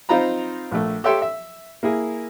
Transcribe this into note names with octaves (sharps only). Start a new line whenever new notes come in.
C4 D#4 F4 C5 A#5 B5
A#1 A3
G4 A4 C#5 E5 G5 C6
E5
A#3 E4 G#4